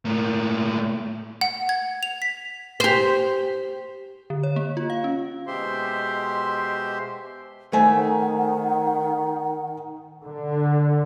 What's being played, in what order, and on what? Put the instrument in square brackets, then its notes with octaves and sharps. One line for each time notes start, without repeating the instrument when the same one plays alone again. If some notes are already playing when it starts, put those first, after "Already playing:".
[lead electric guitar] A2 A#3
[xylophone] F#5
G#6
F7
B6
[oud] G4 C5
[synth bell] D3
C#5
A#3
F4
F5
C#4
[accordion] B2 G#3 G4 C5 E5 C6
[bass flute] D#3 [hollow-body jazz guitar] A3 [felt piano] C5 G#5 [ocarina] F#5
[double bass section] D3